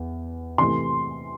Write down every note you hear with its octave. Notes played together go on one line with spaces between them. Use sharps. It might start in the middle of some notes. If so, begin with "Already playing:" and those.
Already playing: E2
C3 E3 A3 C6